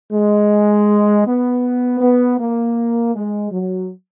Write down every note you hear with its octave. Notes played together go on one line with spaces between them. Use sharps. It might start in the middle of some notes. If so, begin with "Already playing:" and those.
G#3
B3
B3
A#3
G#3
F#3